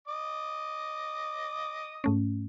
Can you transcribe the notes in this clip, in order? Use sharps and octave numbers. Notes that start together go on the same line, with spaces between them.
D#5 D6 D#6
G#2 A3 C#4